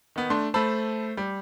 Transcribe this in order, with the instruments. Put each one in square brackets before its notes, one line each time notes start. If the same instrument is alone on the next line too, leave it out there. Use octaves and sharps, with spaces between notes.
[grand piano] D#3 B3
[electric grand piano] A3 D4 [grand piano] C6
[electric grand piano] A3 C5 [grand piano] A5 B5 E6
[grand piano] G3